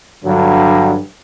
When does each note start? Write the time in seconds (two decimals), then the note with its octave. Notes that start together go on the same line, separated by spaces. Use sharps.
0.24 G2 D3 F#3